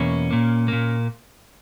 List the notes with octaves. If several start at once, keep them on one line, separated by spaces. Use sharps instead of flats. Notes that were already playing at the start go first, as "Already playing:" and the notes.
Already playing: E2 B2 A#3 C#4
A#2 A#3
A#2 A#3